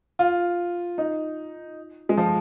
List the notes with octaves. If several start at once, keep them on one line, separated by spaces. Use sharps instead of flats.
F4
D#4
G#3
F3